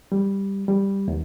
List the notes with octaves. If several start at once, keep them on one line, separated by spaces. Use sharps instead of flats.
G3
G3
D#2